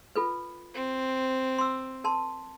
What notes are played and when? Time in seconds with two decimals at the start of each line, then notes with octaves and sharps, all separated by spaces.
0.16 F4 A4 B4
0.74 C4
1.58 C6 E6
2.04 A#4 A5 C6